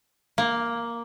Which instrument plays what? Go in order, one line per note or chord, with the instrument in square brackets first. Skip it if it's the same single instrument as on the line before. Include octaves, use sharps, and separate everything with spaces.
[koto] A#3